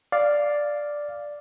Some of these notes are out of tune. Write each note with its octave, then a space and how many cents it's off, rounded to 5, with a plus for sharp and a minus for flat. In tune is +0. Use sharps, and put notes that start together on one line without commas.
D5 +0 F5 +0